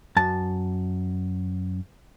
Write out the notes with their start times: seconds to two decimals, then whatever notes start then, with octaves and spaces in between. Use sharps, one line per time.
0.17 F#2 A5